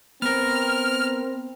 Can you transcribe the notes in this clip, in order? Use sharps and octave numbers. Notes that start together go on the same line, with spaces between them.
B3 C4 A#4 F6